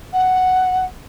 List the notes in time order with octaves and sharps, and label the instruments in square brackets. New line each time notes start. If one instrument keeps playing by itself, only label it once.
[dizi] F#5